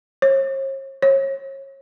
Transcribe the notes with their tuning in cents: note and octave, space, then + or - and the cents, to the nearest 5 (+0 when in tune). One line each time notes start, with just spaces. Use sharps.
C#5 -45
C#5 -30